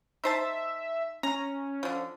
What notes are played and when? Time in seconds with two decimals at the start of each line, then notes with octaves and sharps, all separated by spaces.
0.24 D#4 C5 E5 A5
1.23 C#4 A#5
1.83 D3 F3